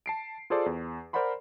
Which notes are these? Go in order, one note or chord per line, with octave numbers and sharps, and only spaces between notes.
A5 C7 D7
F4 G#4 A4 C5 D5
E2
A#4 C5 D5 F#5 B5 C6